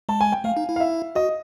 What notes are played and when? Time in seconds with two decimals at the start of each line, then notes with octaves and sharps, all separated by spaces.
0.09 G#3 A5
0.21 G#5
0.32 G5
0.44 A3 F5
0.57 D#4
0.69 E4
0.76 F5
0.80 E5
1.15 F#4 D#5